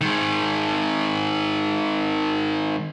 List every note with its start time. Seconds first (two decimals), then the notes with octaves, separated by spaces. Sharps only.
0.01 D#3 G#3